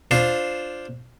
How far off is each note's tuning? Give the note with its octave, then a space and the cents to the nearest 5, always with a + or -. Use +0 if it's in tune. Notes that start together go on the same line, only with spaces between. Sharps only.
D4 +0 F4 +0 C5 +0